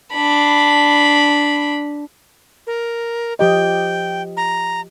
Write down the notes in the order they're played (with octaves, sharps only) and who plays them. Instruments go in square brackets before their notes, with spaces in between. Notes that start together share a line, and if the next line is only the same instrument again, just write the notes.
[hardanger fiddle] D4 B5
[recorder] A#4
[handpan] F3 G4 D#5 [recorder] G5
[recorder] A#5